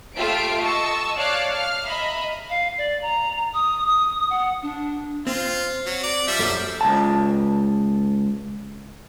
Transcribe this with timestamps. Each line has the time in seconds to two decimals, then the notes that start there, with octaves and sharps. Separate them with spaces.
0.16 A3 F4 G4 E5 C7 D7
0.61 D#5 A5 C#6 E6
1.17 C#5 D5 F5 A5 D6 F#6
1.52 F5 F6
1.86 D#5 E5 A#5 B5
2.50 F5
2.78 D5
3.02 A#5
3.54 D#6
3.87 D#6
4.30 F#5
4.62 D4
5.27 C4 F4
5.86 F#3
6.03 D5
6.28 F3 G3 E5
6.39 F#2 A4 D5
6.81 C#2 A5